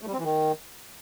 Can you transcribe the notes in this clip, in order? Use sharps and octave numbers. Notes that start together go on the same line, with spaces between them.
A3
G3
C4
E3
D#3